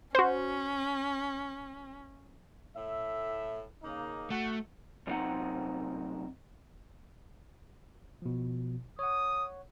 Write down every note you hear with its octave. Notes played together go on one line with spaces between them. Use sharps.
C#4 F#4 C5
A2 E5
C#3 A#3 D#4
A3 F#4 F#5
F#2 C3 D#3 C4 D#4 F#5
B2 F3
C#5 F#5 D#6